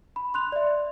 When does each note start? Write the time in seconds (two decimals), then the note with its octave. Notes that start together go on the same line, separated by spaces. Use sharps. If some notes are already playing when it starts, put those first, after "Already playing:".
0.16 B5
0.34 C6 F#6 F7
0.52 D5 E5